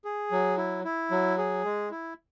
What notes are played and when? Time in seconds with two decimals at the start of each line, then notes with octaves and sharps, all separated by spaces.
0.05 G#4
0.31 F#3
0.57 E4
0.84 E4
1.11 F#3
1.38 G#4
1.65 G#3
1.91 E4